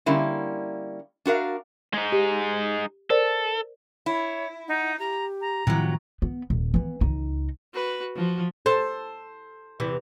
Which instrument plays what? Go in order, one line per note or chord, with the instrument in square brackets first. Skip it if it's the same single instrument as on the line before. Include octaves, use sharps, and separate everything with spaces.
[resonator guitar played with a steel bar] D3 G3 A#3 C#4 E4
D4 F#4 A#4 F5
[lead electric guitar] G#3 D#4
[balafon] G4
[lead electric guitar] A4 [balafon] A#4 C5 D5
[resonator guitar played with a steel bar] E4 [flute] C#5
[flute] D#4 [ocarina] F#5
[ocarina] G4 [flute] A#5
[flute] A#5
[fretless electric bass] A2 D#3 F3 [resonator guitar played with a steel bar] C3 F#3 [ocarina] E4
[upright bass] B3
D#1
E3 B3
C#2 D#4
[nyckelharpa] F#4 B4
[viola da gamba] F3 [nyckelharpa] F#4
[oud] A4 [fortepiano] C5
[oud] E2 C3 E3